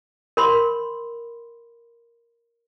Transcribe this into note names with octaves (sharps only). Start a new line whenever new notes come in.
A#4 B5 C6